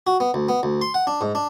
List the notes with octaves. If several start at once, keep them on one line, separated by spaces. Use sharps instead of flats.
F#4
B3
D2
B3
D2
C6
F#5
D4
G#2
D4